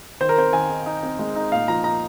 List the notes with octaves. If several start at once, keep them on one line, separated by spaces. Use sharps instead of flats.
D#3 C5
A#4
C4 C5
D#3 G#5
D#4
D#4
C4
G#3
D#4
A#2 F5
F3 A#5
D#4 A#5